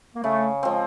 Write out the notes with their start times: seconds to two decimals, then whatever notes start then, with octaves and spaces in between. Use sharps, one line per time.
0.15 A#3
0.23 C#3 A3
0.63 F3 G#3 C4